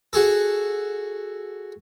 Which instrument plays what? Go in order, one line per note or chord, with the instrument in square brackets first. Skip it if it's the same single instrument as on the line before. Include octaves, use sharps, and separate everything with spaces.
[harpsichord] F#4 G#4 A4